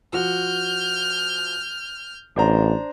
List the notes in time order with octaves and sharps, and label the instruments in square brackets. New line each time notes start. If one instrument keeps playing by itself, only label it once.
[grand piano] F3 F#4 [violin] F6 G6
[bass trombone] A1 [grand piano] D4 C5 A#5